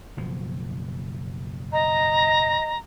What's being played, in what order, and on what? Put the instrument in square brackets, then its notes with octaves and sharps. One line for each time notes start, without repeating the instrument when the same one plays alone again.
[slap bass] F#1 B2 F3
[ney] D#5 [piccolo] A#5